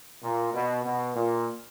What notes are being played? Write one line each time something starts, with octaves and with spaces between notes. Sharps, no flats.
A#2
B2
B2
A#2